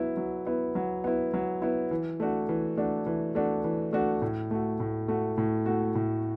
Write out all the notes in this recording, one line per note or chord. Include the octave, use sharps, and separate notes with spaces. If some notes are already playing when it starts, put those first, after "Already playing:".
Already playing: F#3 B3 E4
F#3
B3 E4
F#3
B3 E4
F#3
B3 E4
E3
A3 D4 F#4
E3
A3 D4 F#4
E3
A3 D4 F#4
E3
A3 D4 F#4
A2
A3 F#4
A2
A3 F#4
A2
A3 F#4
A2